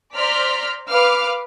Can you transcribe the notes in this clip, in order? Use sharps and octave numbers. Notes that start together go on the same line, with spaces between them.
C5 D5 A#5 C6 F6 B6
B4 F5 D6 F6